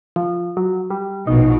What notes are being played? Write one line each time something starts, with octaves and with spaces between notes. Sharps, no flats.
F3
F#3
G3
A#1 B2 D#4